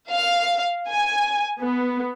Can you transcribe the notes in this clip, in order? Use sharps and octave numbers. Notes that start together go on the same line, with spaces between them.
F5
G#5
B3